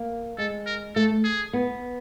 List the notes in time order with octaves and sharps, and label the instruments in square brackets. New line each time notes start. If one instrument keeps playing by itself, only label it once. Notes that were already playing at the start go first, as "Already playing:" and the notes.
Already playing: [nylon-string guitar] A#3
[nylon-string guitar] G#3 [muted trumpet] A4
[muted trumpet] A#4
[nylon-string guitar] A3 [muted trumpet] A4
[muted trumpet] G#4
[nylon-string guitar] B3